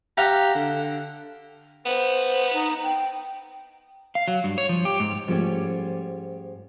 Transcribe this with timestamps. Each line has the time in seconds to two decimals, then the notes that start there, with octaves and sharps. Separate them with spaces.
0.17 G4 F5 F#5 A#5
0.55 D3
1.86 B3 C5
2.53 D#4
2.83 G5
4.15 F5
4.28 F#3
4.44 G2
4.58 C#5
4.69 F3
4.85 G4
5.00 G#2
5.27 G#2 F3 G3 A3 C#4 G4